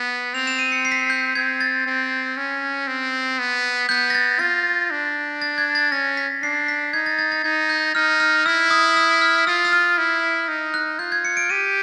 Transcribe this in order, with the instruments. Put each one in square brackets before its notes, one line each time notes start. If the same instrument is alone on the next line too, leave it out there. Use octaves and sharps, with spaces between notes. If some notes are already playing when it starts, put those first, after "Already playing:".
Already playing: [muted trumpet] B3
[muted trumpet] C4 [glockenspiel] F7
[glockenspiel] E7
D#7
C#7
C7
B6
C7
G6
[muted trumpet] C4 [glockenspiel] G#6
[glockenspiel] A6
[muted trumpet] C4
C#4
C4
B3
[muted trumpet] B3 [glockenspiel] G6
[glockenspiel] A#6
A6
[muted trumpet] F4 [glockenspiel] A6
[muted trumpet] D4
[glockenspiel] A6
G#6
A6
[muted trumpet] C#4 [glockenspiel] A#6
[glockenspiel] B6
[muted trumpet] D4 [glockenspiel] C7
[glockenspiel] B6
[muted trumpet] D#4 [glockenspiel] G#6
[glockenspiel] A6
A6
A6
[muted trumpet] D#4 [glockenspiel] G#6
[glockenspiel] G6
[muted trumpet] D#4 [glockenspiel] F6
[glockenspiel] F6
[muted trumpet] E4 [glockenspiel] E6
[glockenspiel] D#6
E6
F6
[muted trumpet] F4 [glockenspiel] E6
[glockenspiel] E6
F6
[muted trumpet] E4
D#4
[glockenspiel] F#6
[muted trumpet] F4 [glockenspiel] G6
[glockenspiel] G#6
C#7
D7
[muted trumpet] G4 [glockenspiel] D#7